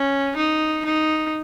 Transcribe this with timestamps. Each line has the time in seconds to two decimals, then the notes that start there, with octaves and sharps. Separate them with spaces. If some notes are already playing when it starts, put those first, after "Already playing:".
Already playing: C#4
0.36 D#4
0.85 D#4